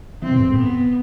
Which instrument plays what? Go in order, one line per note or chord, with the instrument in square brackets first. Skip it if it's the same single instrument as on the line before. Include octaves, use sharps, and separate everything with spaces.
[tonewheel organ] E3 [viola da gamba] C4
[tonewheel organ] B2
G#2
A2
[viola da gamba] B3